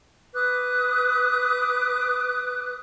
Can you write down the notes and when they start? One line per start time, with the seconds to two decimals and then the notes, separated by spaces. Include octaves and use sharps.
0.34 B4 D6 D#6 F#6